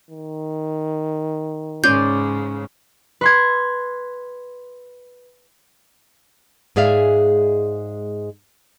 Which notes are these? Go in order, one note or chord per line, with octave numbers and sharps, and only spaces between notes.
D#3
G#2 C#3 C#4 D5 C6 G6
B4 C6 G#6
G#2 G#3 G#4 D5 E5 F5